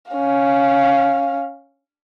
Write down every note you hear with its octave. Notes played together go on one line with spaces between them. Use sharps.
C#4 F5